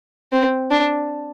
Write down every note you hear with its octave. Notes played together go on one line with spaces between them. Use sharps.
C4
D4